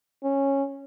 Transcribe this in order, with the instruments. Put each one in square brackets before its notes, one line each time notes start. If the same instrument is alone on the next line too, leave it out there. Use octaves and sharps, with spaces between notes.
[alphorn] C#4